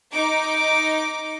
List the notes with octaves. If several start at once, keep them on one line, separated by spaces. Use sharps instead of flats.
D#4 D6